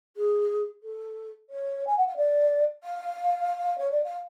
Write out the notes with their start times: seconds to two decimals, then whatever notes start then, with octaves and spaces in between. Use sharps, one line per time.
0.16 G#4
0.83 A4
1.50 C#5
1.87 G#5
1.97 F#5
2.07 F5
2.16 D5
2.83 F5
3.78 C#5
3.91 D5
4.04 F5